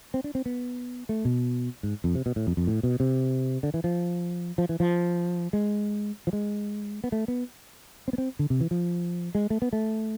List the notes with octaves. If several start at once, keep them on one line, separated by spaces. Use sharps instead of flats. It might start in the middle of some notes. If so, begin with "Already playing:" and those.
C4
D4
C4
B3
A3
B2
G#2
F2
C3
B2
A2
F2
F2
A2
B2
C3
D3
E3
F3
F3
E3
F3
G#3
F3
G#3
B3
A3
B3
C4
B3
C4
D3
C3
E3
F3
G#3
A3
B3
A3